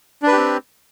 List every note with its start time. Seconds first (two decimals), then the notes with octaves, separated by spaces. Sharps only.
0.23 D4
0.28 B4
0.32 G4
0.37 C4